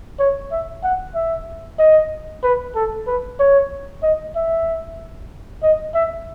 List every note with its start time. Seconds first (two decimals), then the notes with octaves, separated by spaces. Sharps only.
0.19 C#5
0.52 E5
0.84 F#5
1.15 E5
1.79 D#5
2.43 B4
2.75 A4
3.07 B4
3.40 C#5
4.03 D#5
4.36 E5
5.63 D#5
5.95 E5